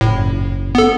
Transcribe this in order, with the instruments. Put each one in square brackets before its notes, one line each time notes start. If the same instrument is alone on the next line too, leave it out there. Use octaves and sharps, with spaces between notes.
[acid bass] F#1 [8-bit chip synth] A2
[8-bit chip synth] B3 A4